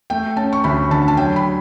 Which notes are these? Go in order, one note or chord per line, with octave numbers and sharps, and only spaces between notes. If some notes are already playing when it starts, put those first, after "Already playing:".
A3 G5
C#4 A5
C#6
D2 B5
D3 A5
A5
F#3 G5
B5